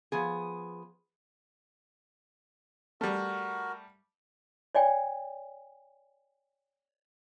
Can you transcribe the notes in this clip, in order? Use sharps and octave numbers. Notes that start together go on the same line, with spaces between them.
F3 B3 G#4
G3 A3 F#4 A#4
C#5 D5 G5 G#5